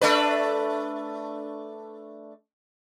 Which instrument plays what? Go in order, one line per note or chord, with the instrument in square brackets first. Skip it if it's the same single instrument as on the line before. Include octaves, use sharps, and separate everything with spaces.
[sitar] A3 D4 B4